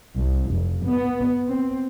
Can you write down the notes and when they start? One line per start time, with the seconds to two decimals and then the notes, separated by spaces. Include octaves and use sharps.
0.18 C2
0.52 F1
0.85 B3
1.48 C4